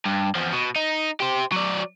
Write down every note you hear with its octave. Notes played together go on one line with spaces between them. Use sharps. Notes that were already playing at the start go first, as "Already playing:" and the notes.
G2
E2 F3
B2
D#4
G4 C5
F#3 D5